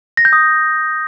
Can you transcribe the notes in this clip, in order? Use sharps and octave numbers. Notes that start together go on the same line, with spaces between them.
A#6
G6
D#6